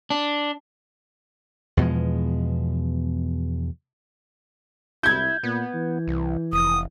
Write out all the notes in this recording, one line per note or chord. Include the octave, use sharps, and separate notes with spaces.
D4
E2 B2 F3 G#3
C2 E4 G6 G#6
A#2 B3
E3
C2
F1 D#6